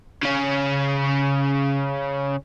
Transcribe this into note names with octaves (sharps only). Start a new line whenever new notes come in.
C#3 C#4